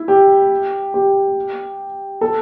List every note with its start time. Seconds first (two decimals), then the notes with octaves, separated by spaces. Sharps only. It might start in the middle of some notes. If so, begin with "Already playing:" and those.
Already playing: E4
0.08 G4
0.94 G4
2.21 A4